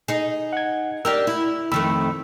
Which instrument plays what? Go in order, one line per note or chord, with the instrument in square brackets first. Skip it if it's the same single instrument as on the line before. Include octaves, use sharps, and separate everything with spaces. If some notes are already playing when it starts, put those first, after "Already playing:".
[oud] D#4 G#4
[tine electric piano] F#5 G#6
[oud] D4 G4 A#4 [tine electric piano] E6
[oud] E4
[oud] F2 D#3 A3 [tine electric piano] B5 E6